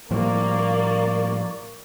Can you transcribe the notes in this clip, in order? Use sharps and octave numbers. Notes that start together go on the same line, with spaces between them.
A2 F3 G3 A#3 D5 C#6 D6